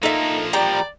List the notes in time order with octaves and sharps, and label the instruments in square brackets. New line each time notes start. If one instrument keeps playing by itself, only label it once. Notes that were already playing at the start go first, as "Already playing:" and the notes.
[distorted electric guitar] F3 A#3 [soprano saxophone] D#4 [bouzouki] A4 E5
[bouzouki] G3 G5 A#5 [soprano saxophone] D5